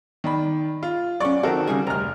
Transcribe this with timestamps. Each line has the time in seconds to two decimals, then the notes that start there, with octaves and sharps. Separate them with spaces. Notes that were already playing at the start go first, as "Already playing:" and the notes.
0.24 D#3 D5 B5
0.83 F4
1.20 F#3 C#4 D5 C#6
1.43 D#3 C4 F#4 A4 A#4
1.67 C#3 G3 G#4
1.87 F1 D2 A#5 F6